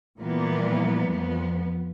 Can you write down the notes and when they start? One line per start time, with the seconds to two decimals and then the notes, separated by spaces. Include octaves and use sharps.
0.19 A#2 E3 F3 G3 A#3 B3
1.08 F2 F3 B3